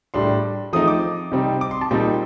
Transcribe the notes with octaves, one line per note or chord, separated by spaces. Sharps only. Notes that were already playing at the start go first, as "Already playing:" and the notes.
A2 G3 D4 C6
F3 A3 C4 D#4 D#6
D6
C3 G3 C4 D#4
D6
C6
A5
A#2 G3 C4 D#4 G5